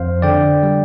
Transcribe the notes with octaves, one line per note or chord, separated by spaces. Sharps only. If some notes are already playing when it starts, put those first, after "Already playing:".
Already playing: F2 C5 F5
D3 D5 G5
G3